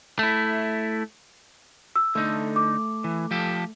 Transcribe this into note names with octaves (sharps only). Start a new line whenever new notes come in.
A3 E4
E6
D3 A3 D#4
D6
E3
F3 G4 A4